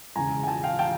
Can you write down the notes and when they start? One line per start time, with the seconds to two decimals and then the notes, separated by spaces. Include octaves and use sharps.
0.16 E1 E2 C#3 G#5 A#5
0.43 G#5
0.47 G5 A5
0.63 F5 G5
0.79 G5 A5